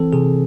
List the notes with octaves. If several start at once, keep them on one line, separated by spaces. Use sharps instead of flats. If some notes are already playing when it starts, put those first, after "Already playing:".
Already playing: E3 C4 A4
C3 G#4